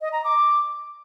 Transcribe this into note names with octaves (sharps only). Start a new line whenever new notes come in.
D#5
A#5
D6